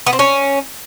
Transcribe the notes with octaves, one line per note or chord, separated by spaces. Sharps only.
B3
C4
C#4